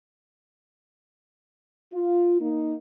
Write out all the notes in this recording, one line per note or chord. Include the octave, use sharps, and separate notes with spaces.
F4
A#3 D#4